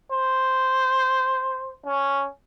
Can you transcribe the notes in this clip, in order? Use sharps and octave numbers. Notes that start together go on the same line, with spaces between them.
C5
C#4